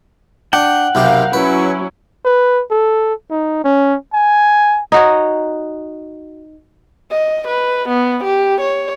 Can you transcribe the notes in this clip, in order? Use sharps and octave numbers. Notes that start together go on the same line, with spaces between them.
D4 F#5 G5
B1 C3 G4 A#4 F5
F#3 C#4 E4 B4
B4
A4
D#4
C#4
G#5
D#4 F#4 C#5
D#5
B4
B3
G4
C#5